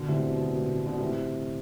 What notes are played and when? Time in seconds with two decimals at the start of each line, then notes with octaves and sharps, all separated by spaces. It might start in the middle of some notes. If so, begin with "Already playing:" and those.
Already playing: B2 D3
0.08 A2 C3
0.27 B2
0.45 B2
0.58 A2
0.72 B2
0.86 B2 D3
1.00 A2 C3